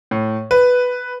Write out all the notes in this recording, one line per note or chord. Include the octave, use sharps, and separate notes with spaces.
A2
B4